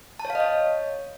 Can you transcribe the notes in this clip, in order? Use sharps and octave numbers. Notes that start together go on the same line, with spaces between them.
A5
C#5
F5
D#5
C#5